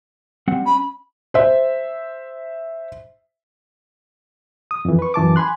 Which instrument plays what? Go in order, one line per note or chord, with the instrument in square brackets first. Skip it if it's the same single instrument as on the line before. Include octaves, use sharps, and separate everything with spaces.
[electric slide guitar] G3 C4 F#5
[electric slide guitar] C#4 [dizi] B5
[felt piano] C5 E5
[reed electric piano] D#6
F2 E3
B4 C#6
F#2 E3 A5 D6
G#5 B5 C6 F#6